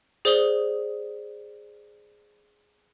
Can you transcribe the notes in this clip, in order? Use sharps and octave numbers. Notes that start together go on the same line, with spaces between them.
G#4 C5 D5 D#6 G7